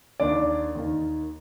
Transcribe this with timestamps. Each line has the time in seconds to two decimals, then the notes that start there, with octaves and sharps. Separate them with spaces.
0.20 D#2 D#3 D4 D5
0.75 D#2 D#3